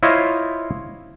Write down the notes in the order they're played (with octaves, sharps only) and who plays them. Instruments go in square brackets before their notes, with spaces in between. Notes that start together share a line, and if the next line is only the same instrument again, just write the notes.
[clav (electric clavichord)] E4 F4 C5 C#5 D#5 F5